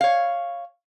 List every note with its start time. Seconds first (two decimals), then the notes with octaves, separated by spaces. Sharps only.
0.01 C#5 F5